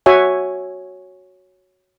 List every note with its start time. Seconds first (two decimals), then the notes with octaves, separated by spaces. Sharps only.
0.06 F#4 C#5 E5 G#5